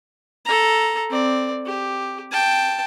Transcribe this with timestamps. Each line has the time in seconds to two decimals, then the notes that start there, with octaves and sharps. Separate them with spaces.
0.45 A4 A#5
1.10 C4 D5
1.66 G4
2.31 G5 A5